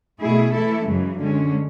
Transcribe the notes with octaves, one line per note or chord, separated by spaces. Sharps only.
B2 A3 E4 G#4
E3 A3 E4 A4
F#2 C#3 E3 G#3
D3 G#3 C#4